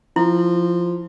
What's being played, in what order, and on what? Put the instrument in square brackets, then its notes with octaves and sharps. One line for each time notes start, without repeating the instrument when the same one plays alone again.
[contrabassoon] F3 [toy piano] E4